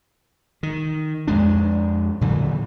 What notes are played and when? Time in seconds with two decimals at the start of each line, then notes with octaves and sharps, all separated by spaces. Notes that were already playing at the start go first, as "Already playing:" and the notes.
0.63 D#3
1.28 F2 G#3 D4
2.21 A#2 D3 E3 F#3